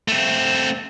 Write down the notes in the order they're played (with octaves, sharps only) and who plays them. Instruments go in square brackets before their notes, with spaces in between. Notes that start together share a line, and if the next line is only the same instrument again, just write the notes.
[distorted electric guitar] A3 C4